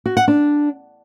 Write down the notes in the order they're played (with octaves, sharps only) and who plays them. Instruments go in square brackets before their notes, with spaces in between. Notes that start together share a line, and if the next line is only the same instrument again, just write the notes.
[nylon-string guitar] F#4
F#5
D4